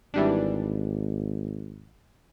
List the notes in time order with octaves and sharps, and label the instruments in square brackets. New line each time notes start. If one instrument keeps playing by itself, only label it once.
[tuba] G#1 [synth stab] E3 G3 D4